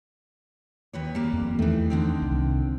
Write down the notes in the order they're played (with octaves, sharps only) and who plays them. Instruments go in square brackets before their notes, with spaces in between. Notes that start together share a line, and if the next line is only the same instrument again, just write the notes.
[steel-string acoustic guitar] D#2 B4 C#5
G3 A#3
[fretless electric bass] F2
[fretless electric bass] E2 A3 [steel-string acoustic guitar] D#3 E3
[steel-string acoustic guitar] D3 D#3 C4
[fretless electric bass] C2